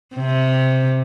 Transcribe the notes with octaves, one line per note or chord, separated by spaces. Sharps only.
C3